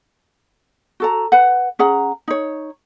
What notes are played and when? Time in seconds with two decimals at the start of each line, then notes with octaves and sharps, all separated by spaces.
1.00 F#4 A4 A#5
1.32 B4 F#5
1.79 C#4 G#4 F#5 A#5
2.28 D#4 C#5